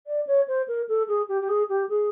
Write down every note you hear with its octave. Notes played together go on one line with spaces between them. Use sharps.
D5
C#5
C5
A#4
A4
G#4
G4
G4
G#4
G4
G#4